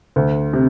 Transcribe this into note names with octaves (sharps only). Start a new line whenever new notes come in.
D2
C3